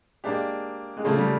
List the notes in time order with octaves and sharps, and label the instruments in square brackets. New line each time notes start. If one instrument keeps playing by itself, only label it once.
[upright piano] G#3 [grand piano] A#3 D4 G4
[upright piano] G#3
[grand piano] C#3 F3 A#3 [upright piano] A3
[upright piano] G3